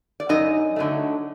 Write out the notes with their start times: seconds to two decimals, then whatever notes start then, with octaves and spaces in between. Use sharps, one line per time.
0.20 D5
0.29 F#2 D#4 D#5
0.76 D3 F#3 A3